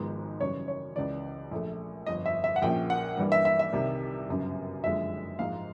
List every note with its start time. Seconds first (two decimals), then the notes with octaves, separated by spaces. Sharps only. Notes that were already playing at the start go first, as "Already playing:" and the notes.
Already playing: G#1 G#2 F3 G#3 B3
0.40 F#2 C#3 E3 G3 C#5
0.68 C#5
0.95 C#2 C#3 E3 D5
1.51 A#1 A#2 F3 A3
2.06 G1 F2 D3 D#5
2.26 E5
2.44 E5
2.56 F#5
2.62 A#1 A#2 F3 A#3 C#4 G5
2.90 F#5
3.17 G2 E3 G3 A#3
3.32 E5
3.45 E5
3.59 E5
3.72 C2 C3 D#3 G3
4.28 G1 F#2 C#3
4.83 F#1 F2 D3 F3 G#3 E5
5.39 A#1 G#2 F3 G#3 F5